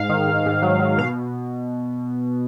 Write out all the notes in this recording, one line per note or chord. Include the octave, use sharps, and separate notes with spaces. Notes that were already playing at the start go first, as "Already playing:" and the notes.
Already playing: G#2 F5
D#3
G#2
G#2
F#3
F#3
B2 F5